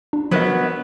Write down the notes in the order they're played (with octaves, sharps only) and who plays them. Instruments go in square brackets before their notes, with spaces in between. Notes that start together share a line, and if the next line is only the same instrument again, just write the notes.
[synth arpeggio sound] D4
[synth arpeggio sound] F3 A#4 D#5 [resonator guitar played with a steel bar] F#3 B3